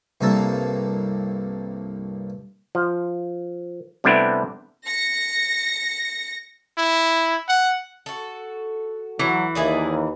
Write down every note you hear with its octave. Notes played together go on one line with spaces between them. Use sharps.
C2 G2 A#3 A4 A5
F3
C3 G3 A3 B3 D4 E4
A#6 C#7
E4
F#5
F#4 A4
E3 F#3
D#2 E4 G#4 D5